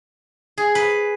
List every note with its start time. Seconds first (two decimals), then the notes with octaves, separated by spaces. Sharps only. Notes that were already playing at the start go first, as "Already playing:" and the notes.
0.58 G#4
0.75 B4